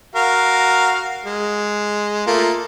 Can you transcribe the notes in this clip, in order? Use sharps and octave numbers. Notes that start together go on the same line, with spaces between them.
F#4 A#4 F5
G#3
A3 A#3 F4